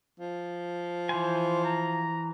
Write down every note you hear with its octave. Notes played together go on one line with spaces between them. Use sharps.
F3
E3 C5 G#5
A#5